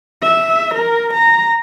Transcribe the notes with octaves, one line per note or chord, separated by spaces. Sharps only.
E5
A#4
A#5